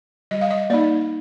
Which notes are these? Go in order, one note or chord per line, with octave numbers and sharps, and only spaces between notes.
G3 D#5
F5
D#5
A#3 D#4 D5